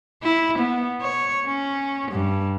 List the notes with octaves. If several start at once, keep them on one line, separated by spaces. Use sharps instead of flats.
E4
B3
C#5
C#4
G2